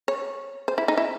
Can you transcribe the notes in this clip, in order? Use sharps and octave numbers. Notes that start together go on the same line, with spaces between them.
C#5
C5
E4
D#4
E4